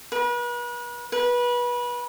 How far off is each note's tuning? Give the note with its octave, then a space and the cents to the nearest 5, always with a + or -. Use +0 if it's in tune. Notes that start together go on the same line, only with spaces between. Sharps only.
B4 -40
B4 -25